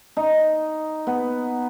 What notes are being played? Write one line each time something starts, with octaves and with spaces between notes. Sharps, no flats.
D#4
B3